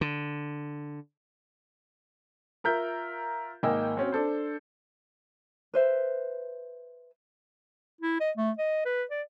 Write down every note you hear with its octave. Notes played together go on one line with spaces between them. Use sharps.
D3
F4 A#4 E5 G6
G#1 A#3 D#5 G5 G#5 E6
C4 C#4 F#4
D4 A4 C5
B4 C5 E5
E4
D#5
A3
D#5
B4
D5